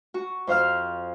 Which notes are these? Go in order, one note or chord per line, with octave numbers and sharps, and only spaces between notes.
F#4
F2 C5 F5 F6